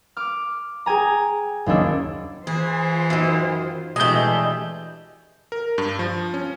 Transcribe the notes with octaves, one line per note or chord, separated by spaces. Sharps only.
D6 F6
G#4 G5 G#5 A#5
F#1 D#2 C#4 D4 E6
E3 F4 G#4 C5
F#2 D#3
B2 E3 G#3 A3 D4 G4 D#5 G6
A#4
G2
F3
C#4